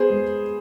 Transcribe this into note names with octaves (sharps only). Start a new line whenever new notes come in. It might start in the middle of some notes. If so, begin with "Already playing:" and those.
Already playing: B3 G#4 C5
G#3